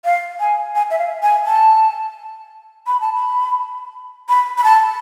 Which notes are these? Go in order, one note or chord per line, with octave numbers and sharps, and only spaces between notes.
F5
G#5
G#5
E5
F5
G#5
A5
B5
A5
B5
B5
B5
A5